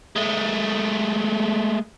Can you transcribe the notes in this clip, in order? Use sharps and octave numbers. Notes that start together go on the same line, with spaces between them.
G#3 A3